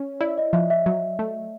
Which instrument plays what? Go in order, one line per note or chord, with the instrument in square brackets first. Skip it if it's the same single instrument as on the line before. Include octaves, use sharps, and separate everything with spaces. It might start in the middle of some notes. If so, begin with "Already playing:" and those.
Already playing: [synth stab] C#4 [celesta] C#5
[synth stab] E4 [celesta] D5
[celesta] D#5
[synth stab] F3 [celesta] E5
[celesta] E5
[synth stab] F#3
A3